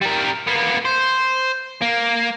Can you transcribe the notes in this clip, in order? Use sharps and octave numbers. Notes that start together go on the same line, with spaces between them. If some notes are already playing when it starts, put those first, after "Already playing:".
G3 A#4
A#3 B3
C5
A#3